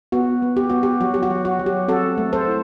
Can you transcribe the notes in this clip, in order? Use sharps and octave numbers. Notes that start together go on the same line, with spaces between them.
B3 F#4
B3
G4
B3 F#4
G4
F#3 F#4
G4
F#4
F#3
F#4
F#3
G4
C4 F#4 A4
A3
A4 C5
E4